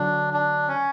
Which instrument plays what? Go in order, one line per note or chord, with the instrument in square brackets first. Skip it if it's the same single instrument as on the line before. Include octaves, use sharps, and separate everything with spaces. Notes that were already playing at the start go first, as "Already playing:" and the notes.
Already playing: [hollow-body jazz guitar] D3 F#3 [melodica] D4
[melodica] D4
C#4